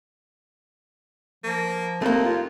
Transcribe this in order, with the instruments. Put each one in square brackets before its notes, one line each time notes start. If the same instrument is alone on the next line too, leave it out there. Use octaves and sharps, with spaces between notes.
[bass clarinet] F3 [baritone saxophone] A#3
[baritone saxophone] D#2 [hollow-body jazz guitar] A3 A#3 [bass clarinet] C4
[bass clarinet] F4